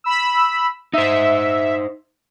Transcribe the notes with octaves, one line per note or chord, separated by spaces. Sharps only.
B5 E6
D#4 C5 E5